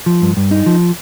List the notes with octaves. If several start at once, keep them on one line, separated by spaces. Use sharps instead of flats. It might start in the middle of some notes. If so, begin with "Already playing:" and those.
F3
G2
G2
D#4
F3